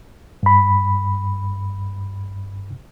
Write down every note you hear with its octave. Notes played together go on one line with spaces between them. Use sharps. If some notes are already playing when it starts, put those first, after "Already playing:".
G2 B5